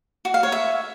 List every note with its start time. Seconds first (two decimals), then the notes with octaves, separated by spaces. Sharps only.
0.25 F#4
0.34 F5
0.43 C#5
0.52 E5